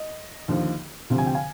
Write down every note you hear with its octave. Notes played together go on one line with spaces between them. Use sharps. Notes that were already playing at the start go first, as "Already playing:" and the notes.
Already playing: D#5
D#2 D3 F3
D2 C3 F3
G#5
G5
F5 G#5